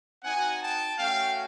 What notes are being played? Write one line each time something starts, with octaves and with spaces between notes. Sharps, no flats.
C4 D#4 F#4 F#5 G#5
G5 A5
A3 C#4 F#4 F5 G5